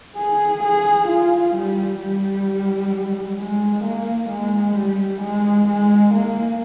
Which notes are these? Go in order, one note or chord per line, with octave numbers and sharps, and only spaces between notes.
G#4
G#4
F4
G3
G3
G#3
A#3
G#3
G3
G#3
G#3
A#3